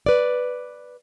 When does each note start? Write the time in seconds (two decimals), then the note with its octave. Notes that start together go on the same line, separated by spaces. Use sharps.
0.06 B4 D5